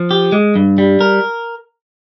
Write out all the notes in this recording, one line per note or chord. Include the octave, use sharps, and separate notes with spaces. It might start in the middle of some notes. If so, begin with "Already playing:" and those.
Already playing: F3
G4
G#3
G2
G3
A#4